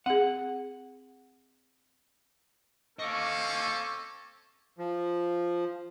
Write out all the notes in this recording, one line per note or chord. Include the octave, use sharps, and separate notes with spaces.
C4 G#4 F#5
C4 C#4 A4 D#5 F5 C#6 D6
F3